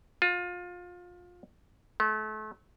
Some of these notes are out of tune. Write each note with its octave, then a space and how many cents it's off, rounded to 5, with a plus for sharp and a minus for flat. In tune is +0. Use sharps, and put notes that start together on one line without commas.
F4 +25
A3 -35